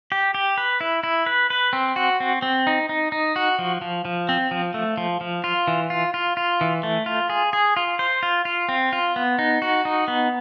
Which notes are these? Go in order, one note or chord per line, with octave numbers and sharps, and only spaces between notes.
G4
G4
B4
E4
E4
B4
B4
C4
F#4
C4
C4
D#4
D#4
D#4
F#4
F3
F3
F3
C4
F3
A3
F3
F3
F4
E3
F4
F4
F4
E3
A3
F4
G#4
G#4
F4
C5
F4
F4
C4
F4
B3
D#4
F#4
D#4
B3